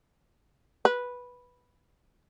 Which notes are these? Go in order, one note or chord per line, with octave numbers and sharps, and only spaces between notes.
B4